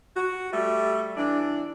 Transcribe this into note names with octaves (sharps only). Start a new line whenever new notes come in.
F#4
G3 A3
E3 D4